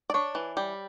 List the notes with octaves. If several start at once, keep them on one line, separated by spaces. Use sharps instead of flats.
D5
D4 C#5
E3
G3